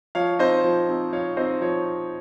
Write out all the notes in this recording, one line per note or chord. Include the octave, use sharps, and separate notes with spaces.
F3 C#5 F5
C4 D#4 C5 D#5
F3
C4 D#4
F3 C#5 F5
C4 D#4 C5 D#5
F3 C#5